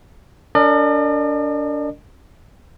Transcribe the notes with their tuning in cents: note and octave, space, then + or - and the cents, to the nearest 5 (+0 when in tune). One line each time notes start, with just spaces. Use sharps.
D4 -30 A#4 -35 D5 +45